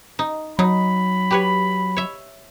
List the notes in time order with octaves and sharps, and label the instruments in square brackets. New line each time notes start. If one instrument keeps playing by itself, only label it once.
[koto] D#4
[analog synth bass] F#3 [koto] D#4 [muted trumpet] B5
[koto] G4 B4 C#5
C#5 E5